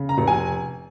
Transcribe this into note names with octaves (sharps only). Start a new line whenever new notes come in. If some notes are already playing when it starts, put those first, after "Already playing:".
Already playing: C#3
A#5
F1
G#5